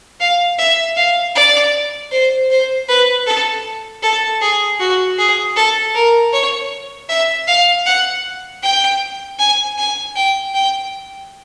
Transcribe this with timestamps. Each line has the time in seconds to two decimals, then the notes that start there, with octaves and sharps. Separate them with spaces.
0.20 F5
0.58 E5
0.96 F5
1.35 D5
2.11 C5
2.50 C5
2.89 B4
3.26 A4
4.03 A4
4.41 G#4
4.80 F#4
5.18 G#4
5.56 A4
5.94 A#4
6.33 C#5
7.09 E5
7.47 F5
7.86 F#5
8.63 G5
9.39 G#5
9.78 G#5
10.16 G5
10.54 G5